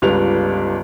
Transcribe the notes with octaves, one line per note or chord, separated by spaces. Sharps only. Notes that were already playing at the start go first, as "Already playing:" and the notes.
G1 C#2 G3 B4 F7